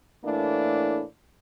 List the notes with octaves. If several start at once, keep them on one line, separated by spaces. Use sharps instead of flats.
A2 E3 A3 A#3 D4